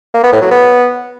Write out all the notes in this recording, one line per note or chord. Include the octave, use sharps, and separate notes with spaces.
A#3
B3
A2
F#3
B3